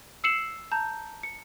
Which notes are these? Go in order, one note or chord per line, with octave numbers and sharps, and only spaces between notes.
E6 C7 C#7 E7 F#7
A5 A#5 G6
C#7